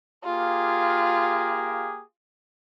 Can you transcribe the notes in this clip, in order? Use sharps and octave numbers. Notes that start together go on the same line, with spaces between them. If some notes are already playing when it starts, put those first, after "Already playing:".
A#3 F4 G4 G#4